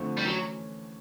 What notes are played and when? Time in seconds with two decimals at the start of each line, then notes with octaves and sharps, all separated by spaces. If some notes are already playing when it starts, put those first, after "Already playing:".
Already playing: F2 D3 F3 A3
0.17 G3
0.25 E3 F#3 A3 C#4